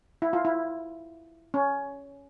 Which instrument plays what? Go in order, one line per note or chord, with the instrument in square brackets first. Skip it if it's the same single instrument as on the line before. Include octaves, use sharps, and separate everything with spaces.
[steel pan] E4
F4
E4
C#4